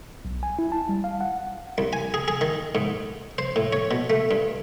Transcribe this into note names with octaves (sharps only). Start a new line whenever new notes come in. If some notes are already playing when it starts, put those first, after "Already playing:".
B1
G#5
E4
A5
G3
F5
F#5
C2
G#5
G#4
G#4
D#3
G#2
C5
A2
C#5
B2
A3
G2